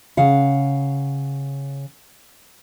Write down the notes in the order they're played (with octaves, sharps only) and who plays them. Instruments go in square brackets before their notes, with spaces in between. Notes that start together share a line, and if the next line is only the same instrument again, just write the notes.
[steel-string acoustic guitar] C#3 F5 F#5